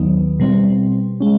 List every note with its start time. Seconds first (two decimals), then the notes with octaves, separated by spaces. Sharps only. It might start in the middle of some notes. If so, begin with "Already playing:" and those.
Already playing: D#2 D#3 F#3 B3 D#4
0.40 B2 G3 C4
1.20 G#3 C#4